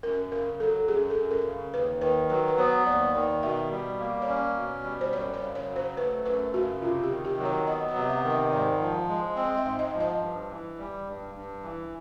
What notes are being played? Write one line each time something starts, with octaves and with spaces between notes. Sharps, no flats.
F#2 A#4
C#3 A#4
F#3 A4
F#2 G#4
A4
F#2
A#4
C#3
D#2 B4
D#3 B4
F#3 B4
B4
B3 C5
D#2 D5
D#3 D5
B2 E5
G3
A#3
C#5
C#4 D5
B2
G3
C5
F#2 C#5
C#5
C#3
C#5
F#3
C5
A3 B4
F#2 B4
C#3 F#4
C3 F4
G4
D#3
G4
F#3
C#5
B3 D#5
D#5
C3
E5
D#3
D#5
G#2 D5
F3
G#3
C4 D#5
E5
G#2
D#5
F3
D#5
G2
E3
G3
G2
G2
E3